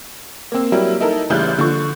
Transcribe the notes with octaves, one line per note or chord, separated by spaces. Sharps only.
A#3 C4
F#3 G3 A#3 E4
D#4 E4 A4 A#4
A1 C#3 E3 G3 F#6 G6
D3 F3 C#6